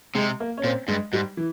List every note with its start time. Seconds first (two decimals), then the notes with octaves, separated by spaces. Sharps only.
0.15 C3 G#3
0.40 A#3
0.57 C#4
0.63 A#2 C4
0.88 G2 G#3
1.13 G#2 G3
1.37 E3